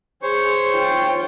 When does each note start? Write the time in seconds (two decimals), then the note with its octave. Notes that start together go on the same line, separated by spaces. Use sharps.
0.22 G#4 C5 C#5 C#6
0.74 F4 G5